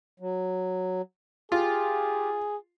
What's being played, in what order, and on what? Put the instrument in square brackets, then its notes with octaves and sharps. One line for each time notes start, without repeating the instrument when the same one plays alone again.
[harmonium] F#3
[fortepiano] F4 [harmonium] G4 [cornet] G#4